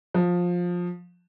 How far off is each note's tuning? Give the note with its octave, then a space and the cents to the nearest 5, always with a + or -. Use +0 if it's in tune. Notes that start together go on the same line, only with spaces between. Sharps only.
F3 +15